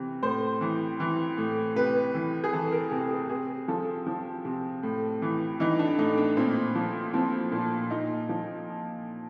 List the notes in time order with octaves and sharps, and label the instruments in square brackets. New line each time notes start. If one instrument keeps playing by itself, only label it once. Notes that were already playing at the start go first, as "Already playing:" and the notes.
Already playing: [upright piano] C3 E3
A2 C5
E3
E3
A2
C3 B4
E3
G#4
E3 A4
A#4
C3 A4
G#4
C3 G#4
F3 A4
F3
C3
A2
E3
E3 D#4
D4
A2 D#4
D4
A#2 C4
F3
F3 C4
A#2
A#2 D#4
F3